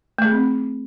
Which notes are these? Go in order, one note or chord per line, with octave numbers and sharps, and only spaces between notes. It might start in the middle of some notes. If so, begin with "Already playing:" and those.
A3
G#4
C4